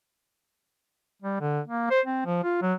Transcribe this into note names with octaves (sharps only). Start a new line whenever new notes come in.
G3
D3
A#3
C5
C4
F3
F4
F#3